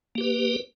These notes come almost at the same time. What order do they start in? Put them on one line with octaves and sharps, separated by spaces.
A#3 G4 B4